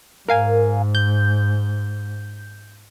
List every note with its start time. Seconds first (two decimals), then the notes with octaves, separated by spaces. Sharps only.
0.28 G#2 A#4 F5 G#5
0.95 G6